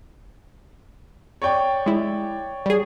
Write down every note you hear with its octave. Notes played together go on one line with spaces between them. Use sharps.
C#5 D5 G5
G#3 E4
G3 G#4